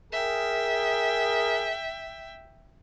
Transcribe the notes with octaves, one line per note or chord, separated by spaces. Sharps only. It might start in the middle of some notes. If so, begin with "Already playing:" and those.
G#4 A#4 E5 G5